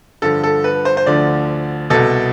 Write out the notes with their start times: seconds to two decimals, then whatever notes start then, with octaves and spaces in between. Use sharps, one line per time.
0.22 G2 D3 F3 A4
0.43 A4
0.64 B4
0.85 C5
0.97 C5
1.06 D2 D3 F3 D5
1.90 C2 B2 A4